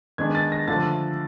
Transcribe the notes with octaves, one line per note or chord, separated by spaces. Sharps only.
D#3 G#3 B3 D4 G#6
A6
A#6
D3 F3 A3 D4 F4 A6